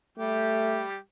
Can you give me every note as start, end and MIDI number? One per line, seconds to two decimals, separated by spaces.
0.18 0.96 55
0.18 0.85 57
0.18 0.96 67